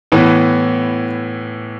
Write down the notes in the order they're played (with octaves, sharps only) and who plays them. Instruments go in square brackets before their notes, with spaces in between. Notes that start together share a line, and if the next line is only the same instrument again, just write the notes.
[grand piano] A2 E3 B3